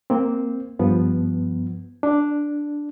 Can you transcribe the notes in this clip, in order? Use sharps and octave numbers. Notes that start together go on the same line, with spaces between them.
A#3 C4
G2 F3 B3
D4